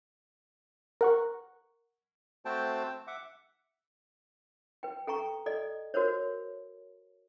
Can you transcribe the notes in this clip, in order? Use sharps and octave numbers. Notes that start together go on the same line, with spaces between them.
A#4 F#5 C#6
A3 C4 F#4 C5 G5 A5
E5 F#5 D6
B4 G5
A4 G5 A#5 C#6
A4 D5 D#5
F#4 A#4 C5 C#5